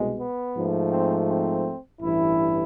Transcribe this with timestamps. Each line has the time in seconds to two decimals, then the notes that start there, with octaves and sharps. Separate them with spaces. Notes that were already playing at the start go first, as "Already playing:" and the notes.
Already playing: C2 B2 G#3
0.19 B3
0.56 G#2 F3 A3
0.91 C4
1.28 C4
2.01 A1 G2 E3 E4